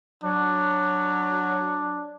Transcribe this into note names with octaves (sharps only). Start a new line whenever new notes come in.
F#3 D4